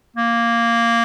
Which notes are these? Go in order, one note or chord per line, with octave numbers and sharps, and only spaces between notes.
A#3